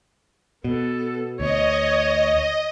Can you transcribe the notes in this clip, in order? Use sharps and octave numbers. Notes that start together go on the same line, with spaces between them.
B2 B3 A4
D2 C#5 D#5